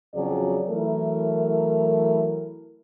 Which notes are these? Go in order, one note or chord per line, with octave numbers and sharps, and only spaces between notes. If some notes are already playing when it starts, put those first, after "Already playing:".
F2 C#3 F#3 F#4 G#4 D5
E3 F#3 A3 E4 A#4